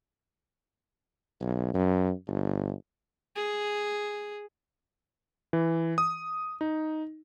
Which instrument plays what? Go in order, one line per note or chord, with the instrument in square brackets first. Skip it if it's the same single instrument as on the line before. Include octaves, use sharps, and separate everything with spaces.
[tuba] B1
F#2
G1
[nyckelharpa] G#4
[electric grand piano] E3
D#6
D#4